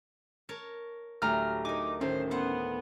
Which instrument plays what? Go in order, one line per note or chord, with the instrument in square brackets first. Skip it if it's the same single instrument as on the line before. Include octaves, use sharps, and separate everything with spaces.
[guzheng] A#4 C#5 A5
[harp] D2 A#5 [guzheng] A2 F#3 G3 [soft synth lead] F6
[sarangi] D#4 [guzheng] A#4 G#5 [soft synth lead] D6
[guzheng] A2 D#3 [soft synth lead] C#4 [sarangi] C5
[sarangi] B3 [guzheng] A4 C5 F#5